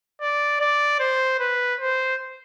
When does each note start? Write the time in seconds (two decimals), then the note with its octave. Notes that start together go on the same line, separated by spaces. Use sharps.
0.21 D5
0.61 D5
1.00 C5
1.40 B4
1.80 C5